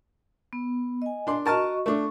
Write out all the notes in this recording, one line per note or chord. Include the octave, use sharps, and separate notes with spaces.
B3
D#5 G#5
D4 C6
F#4 A#4 D#5 A5 C#6 F6
A3 D4 C#6